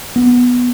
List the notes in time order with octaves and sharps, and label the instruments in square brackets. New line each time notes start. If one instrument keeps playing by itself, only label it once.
[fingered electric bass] B3